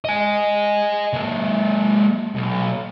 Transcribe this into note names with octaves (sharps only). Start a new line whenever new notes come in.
D#5 G#5
G#3 A#3
B1